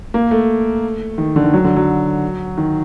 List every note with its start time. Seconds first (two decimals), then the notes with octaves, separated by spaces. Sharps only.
0.14 A#3
0.31 A3
1.18 D#3
1.36 D3
1.45 D#3
1.53 F#3
1.65 D3
1.76 F#3
2.58 D#3